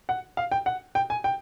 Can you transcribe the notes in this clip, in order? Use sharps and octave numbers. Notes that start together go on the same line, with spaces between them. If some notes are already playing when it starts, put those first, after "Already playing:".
F#5
F5
G5
F#5
G5
G#5
G5